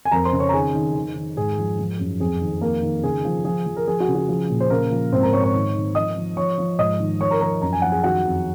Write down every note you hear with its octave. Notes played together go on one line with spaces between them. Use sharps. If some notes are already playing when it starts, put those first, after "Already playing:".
G#5
F2 A#4 A#5
C5 C6
C#3
C#5 C#6
A#5
D#3 G#4 G#5
D#3
D#3
D#3
G#2 G#4
F3
F3
F#2
F2 G#4
D#3
F2 A#3 A#4
D#3
C#3 G#4
F3
F3 G#4
F3
A#4
F3 G#4
F#4
C#3
F#4
F3 G#4
A#2
C5
C#3 A#3 A#4
F3
G#2 C4 C5
A#4 A#5
G#2 C#5 C#6
C#5 C#6
D#3
D#3
F3 D#5 D#6
F3
F3 C#5 C#6
F3
G#2 D#5 D#6
D#3
F3 C#5 C#6
A#4 A#5
F3 A#4 A#5
F#2 A#5
G#5
F3 F#5
G#4 G#5
D#3 F#4 F#5
F2